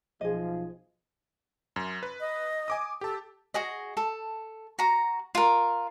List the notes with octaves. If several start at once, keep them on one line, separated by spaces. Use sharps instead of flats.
B1 F3 G#4 D#5
F#2
B4
D#5
G#5 D6 D#6
G4 A4 A5
F#4 G#4 D#5
A4
F#4 A#5
F4 A#4